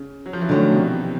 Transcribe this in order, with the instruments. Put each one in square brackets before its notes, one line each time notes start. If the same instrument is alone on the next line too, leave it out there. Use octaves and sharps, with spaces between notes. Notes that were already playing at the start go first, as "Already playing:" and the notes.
Already playing: [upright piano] C#3
F#3
F3
E3
[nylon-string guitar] D3 F#3 A3 [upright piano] D#3
[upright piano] B2
C3
C3